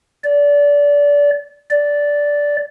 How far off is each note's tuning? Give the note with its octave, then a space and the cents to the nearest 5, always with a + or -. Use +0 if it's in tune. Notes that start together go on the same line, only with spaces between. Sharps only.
D5 -25
D5 -10